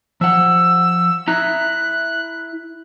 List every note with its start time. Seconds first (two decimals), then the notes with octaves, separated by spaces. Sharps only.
0.21 F3 F#5 E6
1.28 E4 E5 A#5 F#6